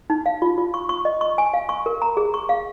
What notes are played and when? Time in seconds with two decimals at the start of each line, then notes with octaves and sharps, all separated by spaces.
0.10 D#4
0.26 F5
0.42 F4
0.58 F4
0.74 C#6
0.89 C#6
1.05 D#5
1.21 C#6
1.38 G#5
1.54 F5
1.69 C#6
1.86 A#4
2.02 A#5
2.17 G#4
2.34 C#6
2.49 F5